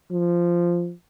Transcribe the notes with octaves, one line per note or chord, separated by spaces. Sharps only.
F3